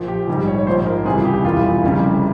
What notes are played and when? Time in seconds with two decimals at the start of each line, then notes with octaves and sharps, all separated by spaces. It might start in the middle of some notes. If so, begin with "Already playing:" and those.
Already playing: A#1 A#2 F3
0.08 G4
0.28 A#1 G#2 G3
0.47 C#5
0.58 C#5
0.67 A#1 G#2 F3 C5
0.86 A#4
1.05 C#2 C3 E3 G3 G#4
1.25 G4
1.44 E1 E2 E3 G3 F4
1.83 F1 F2 C#3 G3